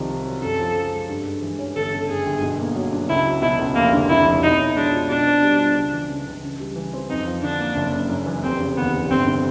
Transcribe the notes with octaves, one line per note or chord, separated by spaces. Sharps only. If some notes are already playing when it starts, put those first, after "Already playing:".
Already playing: C2 D#3 F3
C3
F#3
F#2 A4
F3
C#3
G#3
G2
G#3
E3
C#4
G1 A4
C#3
F#2 G#4
G1
B2
A#3
F#3
D4
C#2 E4
F#3
B2 E4
C#2
F1 A#3
D3
F2 E4
F1
B2 D#4
C#4
G#3 D4
F4
B2 D4
C4
G3
F4
C#2
E3
C#3
C#2
C#3
G3
E3
C4
F2 D#4
F3
D3 D4
A#3
F#1
C#3
F#2
E3
F1 C4
C#3
D#2 B3
F1
G1 C4
D3